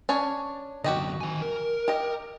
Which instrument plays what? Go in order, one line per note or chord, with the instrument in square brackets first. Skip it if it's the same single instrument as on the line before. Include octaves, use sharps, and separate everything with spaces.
[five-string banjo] C#4 D4 C#5
[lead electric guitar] F#2 D3 [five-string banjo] F#4 G4 D#5
[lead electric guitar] D#3 G#5
A#4
[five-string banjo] G4 D#5